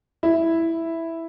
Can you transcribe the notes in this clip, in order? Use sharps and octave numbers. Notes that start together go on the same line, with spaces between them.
E4